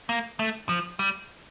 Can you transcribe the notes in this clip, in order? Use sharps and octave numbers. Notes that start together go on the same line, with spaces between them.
A#3
A3
F3
G3